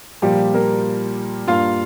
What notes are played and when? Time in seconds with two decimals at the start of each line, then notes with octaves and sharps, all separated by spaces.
0.22 A#2 F3 G3 A#3 G4
0.54 A#3 A#4
1.47 G2 G3 A#3 F4 F5